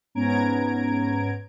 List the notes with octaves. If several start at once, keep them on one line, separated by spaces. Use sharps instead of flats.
G#2 B3 C#4 A#5 G#6 D7